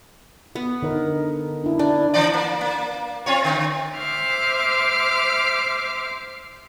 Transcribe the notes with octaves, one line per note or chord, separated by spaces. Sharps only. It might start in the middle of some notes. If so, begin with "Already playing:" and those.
B3
D3 D#4 A#4
D4 E4
D4 E4
E3 D4 D5
A#3
A#3
C4 F4 C#5
D3
C5 E5 D6 F6